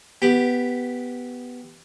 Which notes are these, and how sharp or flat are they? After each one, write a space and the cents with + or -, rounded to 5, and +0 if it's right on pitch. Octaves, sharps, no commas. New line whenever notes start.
B3 +0 G4 +0